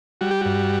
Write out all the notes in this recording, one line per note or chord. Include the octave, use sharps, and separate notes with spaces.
G3 F#4
G4
G2 F#4